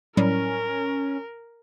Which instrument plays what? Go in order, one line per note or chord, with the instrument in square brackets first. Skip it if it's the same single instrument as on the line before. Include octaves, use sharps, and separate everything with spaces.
[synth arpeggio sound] A2 F#3 G3 [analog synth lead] C#4 [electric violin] A#4